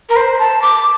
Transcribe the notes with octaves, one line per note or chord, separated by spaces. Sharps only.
A#4
C5
A5
D6